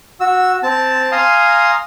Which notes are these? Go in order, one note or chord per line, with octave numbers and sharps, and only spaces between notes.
F#4 E6
C4 A5
F5 G#5 A#5 C6 D#6